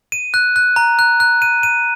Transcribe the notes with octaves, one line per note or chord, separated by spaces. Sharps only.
D#7
F#6
F#6
A#5
F#6
F#6
D#7
D#7